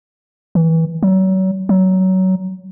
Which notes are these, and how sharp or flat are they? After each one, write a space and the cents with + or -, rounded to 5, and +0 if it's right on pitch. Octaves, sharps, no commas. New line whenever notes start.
E3 -20
F#3 +35
F#3 +20